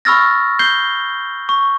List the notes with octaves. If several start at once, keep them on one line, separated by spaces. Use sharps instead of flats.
B5 C#6 E6 F6 A6 A#6
G6 C7 G7
C#6